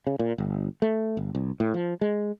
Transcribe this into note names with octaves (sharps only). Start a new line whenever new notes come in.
C#3
A#2
G1
A3
G1
C2
A2
F3
G#3